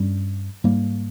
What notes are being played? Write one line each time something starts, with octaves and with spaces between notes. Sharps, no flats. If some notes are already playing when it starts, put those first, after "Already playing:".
Already playing: G2 G3 C#4
G#2 G3 A#3